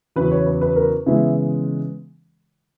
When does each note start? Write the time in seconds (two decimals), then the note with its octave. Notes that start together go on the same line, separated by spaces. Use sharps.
0.16 E2 C#3 F#3 B3 B4
0.31 C#5
0.46 B4
0.61 B4
0.76 A#4
1.06 C#3 E3 G#3 B3 E4